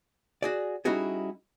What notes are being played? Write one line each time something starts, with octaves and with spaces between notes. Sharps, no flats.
F#4 G#4 D5
G3 C#4 D#4 E4 F#4 G#4